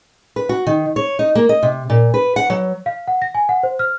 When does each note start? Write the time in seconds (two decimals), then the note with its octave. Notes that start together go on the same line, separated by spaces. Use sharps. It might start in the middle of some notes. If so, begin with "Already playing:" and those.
0.36 B4
0.49 F#4
0.67 D#3
0.96 C#5
1.19 D#4
1.35 A#3
1.49 D#5
1.63 C3
1.90 A#2
2.14 B4
2.36 F#5
2.50 F#3
2.86 F5
3.08 F#5
3.22 A#6
3.35 G#5
3.49 F#5
3.63 C5
3.79 F6